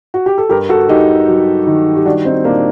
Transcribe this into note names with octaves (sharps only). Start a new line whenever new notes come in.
F#4
G4
A4
G2 G4 A#4
F#4 A4
G2 D#4 G4
F#3
D#3
G4
G3 D4 F#4
C4 D#4
A#2 A#3 D4